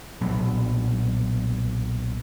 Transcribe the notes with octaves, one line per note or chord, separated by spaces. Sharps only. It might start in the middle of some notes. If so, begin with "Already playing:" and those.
B1 A#2 F#3 B3